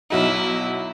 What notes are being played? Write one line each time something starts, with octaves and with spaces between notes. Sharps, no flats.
B1 F#3 D#4 E4